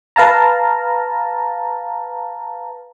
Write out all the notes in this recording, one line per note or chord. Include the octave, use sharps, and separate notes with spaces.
B4 F5 A5 A#5